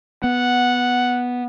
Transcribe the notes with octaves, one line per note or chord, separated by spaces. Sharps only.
B3 F#5